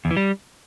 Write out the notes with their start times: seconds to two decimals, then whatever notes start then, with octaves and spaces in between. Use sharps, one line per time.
0.05 E2
0.11 E3
0.17 G3